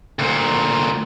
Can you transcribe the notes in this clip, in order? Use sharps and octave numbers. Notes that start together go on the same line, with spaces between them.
D2 A#2